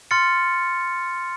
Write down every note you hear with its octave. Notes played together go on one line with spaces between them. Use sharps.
C6 F6 A6 C#7